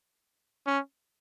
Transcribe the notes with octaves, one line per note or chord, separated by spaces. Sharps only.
C#4